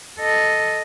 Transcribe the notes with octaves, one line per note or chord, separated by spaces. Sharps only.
A4 D#5